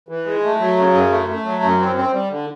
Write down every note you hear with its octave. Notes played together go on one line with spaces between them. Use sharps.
E3
G#3
A3
F#3
C#3
F#2
A3
A3
F#3
F#2
C4
C4
G3
D3